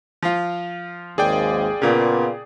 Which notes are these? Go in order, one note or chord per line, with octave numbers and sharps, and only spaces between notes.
F3 F4
G#1 D#2 G#2 G#4 D5 G5
A#2 C#3 A#3 B3 F4